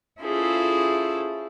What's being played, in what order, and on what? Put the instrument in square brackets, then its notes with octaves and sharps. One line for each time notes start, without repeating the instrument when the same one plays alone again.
[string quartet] C#4 E4 F4 G#4 A4 C5